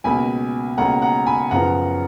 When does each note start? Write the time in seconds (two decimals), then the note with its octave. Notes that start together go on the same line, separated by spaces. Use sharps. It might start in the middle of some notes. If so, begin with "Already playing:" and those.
0.04 C#2 B2 A#3 G#5 B5
0.78 C#2 B2 A#3 F#5 A#5
1.02 F#5 A#5
1.26 G#5 B5
1.51 F#2 C#3 F3 B3 F#5 A#5